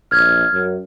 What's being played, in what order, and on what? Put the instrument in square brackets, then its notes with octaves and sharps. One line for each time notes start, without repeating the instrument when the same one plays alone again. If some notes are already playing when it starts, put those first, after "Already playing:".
[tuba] A#1 [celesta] F6 G#6
[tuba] F#2